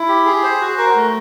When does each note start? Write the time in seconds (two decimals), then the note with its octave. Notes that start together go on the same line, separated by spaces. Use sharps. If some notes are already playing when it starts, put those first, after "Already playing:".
Already playing: E4
0.08 G4
0.26 G#4
0.43 C5
0.61 F#4
0.78 A#4
0.95 A3